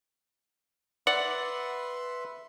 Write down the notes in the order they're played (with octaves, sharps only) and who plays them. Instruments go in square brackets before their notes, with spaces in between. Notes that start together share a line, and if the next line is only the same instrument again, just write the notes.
[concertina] B4 E5 C6 [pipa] D5 [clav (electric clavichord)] F#5